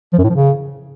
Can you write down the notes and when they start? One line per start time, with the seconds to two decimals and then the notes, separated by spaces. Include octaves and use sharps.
0.13 F3
0.18 F#2
0.24 A2
0.30 F3
0.35 C#3